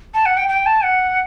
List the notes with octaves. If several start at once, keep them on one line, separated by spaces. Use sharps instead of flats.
A5
F#5
G5
G5
A5
F#5